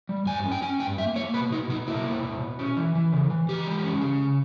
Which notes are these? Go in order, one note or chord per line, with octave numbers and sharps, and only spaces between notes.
G3
G2 G#5
C#4
G5
C#4 G#5
G2 G5
A#3 E5
A#3 C#5
B2 B4
B2 D#4
B2 D#4
A#3 E4
B2
B2
B2
C#4
E3
E3
C#3
E3
E3 G4
G#3
C#4
C#3